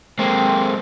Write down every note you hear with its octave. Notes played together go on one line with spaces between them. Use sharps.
G#3 A#3 C4